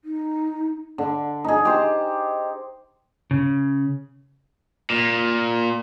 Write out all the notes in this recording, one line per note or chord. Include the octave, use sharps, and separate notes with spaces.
D#4
D3
D#4 G#4
G4 C5
C#3
A#2